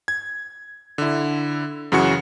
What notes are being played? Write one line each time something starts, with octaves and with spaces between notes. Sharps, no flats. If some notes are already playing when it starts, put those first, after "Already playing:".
G#6
D3 E4
F#2 C#3 E3 F#4 C#6 C#7